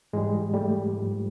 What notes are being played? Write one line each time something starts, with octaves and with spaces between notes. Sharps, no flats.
G#2 E3 G3 G#3
G3 A3
G#2 F3